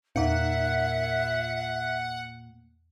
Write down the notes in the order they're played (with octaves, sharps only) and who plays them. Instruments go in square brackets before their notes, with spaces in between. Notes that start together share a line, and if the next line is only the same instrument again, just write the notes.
[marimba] E2 D#4 [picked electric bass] A#2 [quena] E5 [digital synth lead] F#5